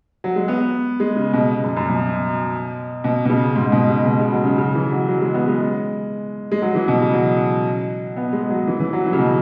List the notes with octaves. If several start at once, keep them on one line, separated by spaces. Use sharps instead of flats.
F#3
G#3
B3
G#3
C#3
B2
F#2
F#2
B2
B2
B2
C#3
G#2
G#2
B2
C#3
B2
C#3
F#3
C#3
C#3
E3
F#3
F#3
G#3
B3
G#3
G#3
F#3
E3
B2
C#3
F#3
B3
G#3
F#3
E3
E3
F#3
E3
C#3
B2